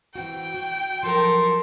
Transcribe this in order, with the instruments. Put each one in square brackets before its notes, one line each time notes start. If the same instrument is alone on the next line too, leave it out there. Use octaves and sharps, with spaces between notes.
[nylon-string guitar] E3 C4 F#4 [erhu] G5
[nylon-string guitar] F#4
[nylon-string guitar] F3 F#3 [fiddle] A4 A#4 [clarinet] C6